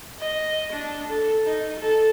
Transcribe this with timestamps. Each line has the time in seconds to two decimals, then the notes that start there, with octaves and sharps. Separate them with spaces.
0.19 D#5
0.72 D4
1.07 A4
1.46 D#4
1.80 A4